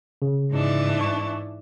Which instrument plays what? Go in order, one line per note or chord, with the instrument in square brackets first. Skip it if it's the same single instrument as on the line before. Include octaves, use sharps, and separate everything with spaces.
[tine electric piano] C#3
[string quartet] G#2 E3 D4
[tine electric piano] C#6